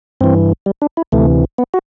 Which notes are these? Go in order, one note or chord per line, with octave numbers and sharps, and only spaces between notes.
G2 E3 C4
G3
D4
E4
D2 C3 E3 A3
B3
F#4